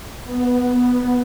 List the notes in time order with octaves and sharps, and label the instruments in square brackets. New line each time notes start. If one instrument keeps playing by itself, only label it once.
[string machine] B3